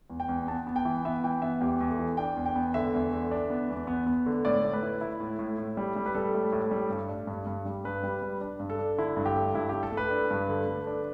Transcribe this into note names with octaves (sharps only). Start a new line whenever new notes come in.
E2
G5
E2
B3 A5
B3
G5
E3
B3 E5
E3 G5
B3 E5
E2 G4
E2
A4
E3
D4 G5
E2
G5
B3
D3 E5
E2
D3
D4
B3
E2
B3
B3
D3
A2 D5
A2
B4
E4
E4
A2
A2
A2
G3
G3
B4
G3 A4
A2
A2
G3
G2
D4
G2
G2
G3
G2 B4
G3
G3
D4
G2
A4
D4
D3 E4
G2
G4
A3
G2 E4
A3 G4
A4
A3
B4
D4
G2
D3
A3
D4